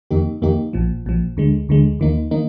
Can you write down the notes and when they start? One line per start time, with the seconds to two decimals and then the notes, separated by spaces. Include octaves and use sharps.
0.11 F2 D#3 A#3 D#4 G4
0.42 F2 D#3 A#3 D#4 G4
0.73 A#1 A#2 F3
1.06 A#1 A#2 F3
1.37 D2 D3 G#3
1.69 D2 D3 G#3
2.00 D#2 D#3 A#3 D#4
2.31 D#3 A#3 D#4